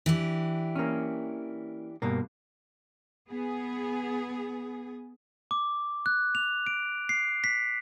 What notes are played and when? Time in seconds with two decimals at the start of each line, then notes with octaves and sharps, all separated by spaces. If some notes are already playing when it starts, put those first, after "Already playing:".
0.06 E3 D4 G4
0.75 A#3 C#4
2.02 G2 B2 A#3
3.31 B3 G#4
5.51 D6
6.06 F#6
6.35 F7
6.67 D7
7.09 C7
7.44 B6